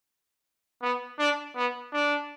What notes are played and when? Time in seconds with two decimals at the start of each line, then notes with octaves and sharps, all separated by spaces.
0.82 B3
1.19 D4
1.55 B3
1.93 D4